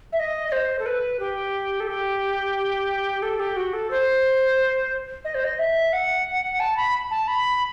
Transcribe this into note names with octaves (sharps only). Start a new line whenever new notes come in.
E5
D#5
D#5
C5
A4
B4
G4
A4
G4
A4
G4
F#4
A4
C5
D#5
C5
D#5
E5
F#5
A5
B5
A5
B5